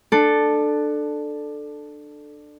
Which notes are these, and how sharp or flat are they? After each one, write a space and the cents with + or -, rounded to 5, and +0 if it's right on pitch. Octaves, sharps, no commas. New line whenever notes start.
D4 +20 A4 +0